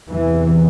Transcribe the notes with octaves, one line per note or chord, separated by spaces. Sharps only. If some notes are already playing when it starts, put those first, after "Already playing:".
E2 C3 E3